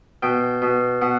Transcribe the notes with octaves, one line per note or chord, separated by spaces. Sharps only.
B2 G5
B2
B2 F#5